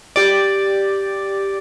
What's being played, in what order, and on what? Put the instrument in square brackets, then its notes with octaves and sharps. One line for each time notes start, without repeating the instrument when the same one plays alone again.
[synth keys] G4 D5